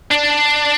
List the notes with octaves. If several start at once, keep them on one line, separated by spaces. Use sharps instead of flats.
D4